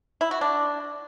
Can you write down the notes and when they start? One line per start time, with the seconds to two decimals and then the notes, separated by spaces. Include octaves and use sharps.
0.21 E4
0.31 F#4
0.41 D4